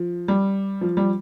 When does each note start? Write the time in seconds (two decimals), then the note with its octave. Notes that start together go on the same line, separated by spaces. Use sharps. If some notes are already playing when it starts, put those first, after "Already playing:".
Already playing: F3
0.28 G3
0.81 F3
0.97 G3